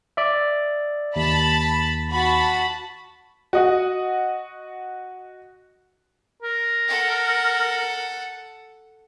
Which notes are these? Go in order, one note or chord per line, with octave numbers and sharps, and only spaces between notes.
D5 E5
D#2 A5 B5
F#4 A5 B5
F#4 D#5 F#5
A#4
A4 F#5